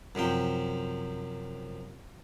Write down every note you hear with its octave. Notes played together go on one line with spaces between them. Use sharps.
F#2 C3 F3 G5